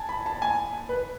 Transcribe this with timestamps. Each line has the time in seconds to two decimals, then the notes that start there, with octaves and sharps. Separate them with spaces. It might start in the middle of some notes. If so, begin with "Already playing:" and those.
Already playing: G#5 A5
0.09 B5
0.26 A5
0.42 G#5
0.89 B4